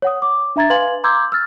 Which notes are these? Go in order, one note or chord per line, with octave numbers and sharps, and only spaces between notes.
C#5 F#5 D#6
D6
D4 E5 A#5 G#6 A6
B4 F5 G#5 C6 G#6 F#7
A#5 C6 D6 E6 G6 G#6
E6 F6 A6